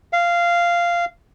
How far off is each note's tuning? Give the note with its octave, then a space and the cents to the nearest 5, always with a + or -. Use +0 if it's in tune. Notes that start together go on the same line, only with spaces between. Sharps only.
F5 -10